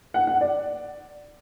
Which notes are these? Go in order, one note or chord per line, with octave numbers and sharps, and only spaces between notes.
F#5
F#5
D5